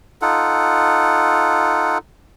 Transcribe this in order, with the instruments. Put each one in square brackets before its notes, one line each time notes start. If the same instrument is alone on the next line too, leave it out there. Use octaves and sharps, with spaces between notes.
[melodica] D#4 F4 A4 F#5